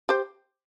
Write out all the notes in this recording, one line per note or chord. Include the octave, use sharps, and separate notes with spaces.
G4 C5